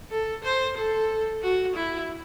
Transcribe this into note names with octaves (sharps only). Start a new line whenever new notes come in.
A4
C5
A4
F#4
E4